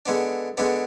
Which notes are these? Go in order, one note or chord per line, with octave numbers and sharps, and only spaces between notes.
D3 G#3 B3 D4
D3 G#3 B3 D4